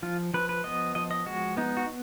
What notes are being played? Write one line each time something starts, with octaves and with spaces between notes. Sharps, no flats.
F3 F4
F3 B4
B4
B3 D#5
F3 D#5
D#5
G#3 F#4
B3 D#4
F#4